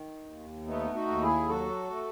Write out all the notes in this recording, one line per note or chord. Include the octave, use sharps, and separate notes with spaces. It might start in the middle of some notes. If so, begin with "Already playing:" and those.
Already playing: D#3
D#2
A3 B3 D#4
D#4 F#4
D#2
E4 G#4
F#3 F#4 A4
A3